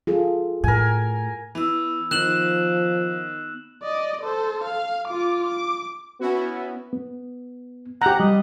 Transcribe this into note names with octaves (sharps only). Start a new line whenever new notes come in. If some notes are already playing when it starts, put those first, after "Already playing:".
F4 G#4 A4
A2 A#4 G#5
E3 B3 E6
D#3 F3 F#6 E7 F#7
D5 D#5
A4 C5
F5
F4 D6
D6
B3 C#4 E4 F#4
B3
G4 F#5 A#5
G3 D#5